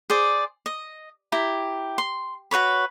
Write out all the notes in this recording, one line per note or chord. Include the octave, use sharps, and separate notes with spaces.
G#4 C5 D5
D#5
E4 G4 A#5
C6
F#4 B4 C#5 B5